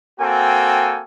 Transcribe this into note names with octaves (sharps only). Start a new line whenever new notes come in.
A#3 C4 F#4 A4 G5 G#5